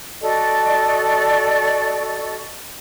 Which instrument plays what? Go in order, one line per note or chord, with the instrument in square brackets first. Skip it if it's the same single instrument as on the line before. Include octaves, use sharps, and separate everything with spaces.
[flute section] F#4 A4 D5 D#5